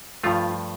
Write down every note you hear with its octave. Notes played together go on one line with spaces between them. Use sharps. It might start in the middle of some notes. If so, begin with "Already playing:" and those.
G2 F3 A3 F4